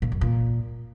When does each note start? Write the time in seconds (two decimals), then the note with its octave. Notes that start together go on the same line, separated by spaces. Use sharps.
0.02 A#2
0.12 F#2
0.21 A#2